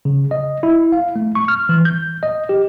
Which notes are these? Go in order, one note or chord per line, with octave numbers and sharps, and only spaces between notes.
C#3
D#5
E4
F5
A3
C#6
F6
E3
G6
D#5
G4